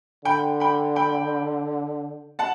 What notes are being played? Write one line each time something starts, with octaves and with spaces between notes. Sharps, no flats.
D3 G5 B5
G5 B5
G5 B5
F#5 A5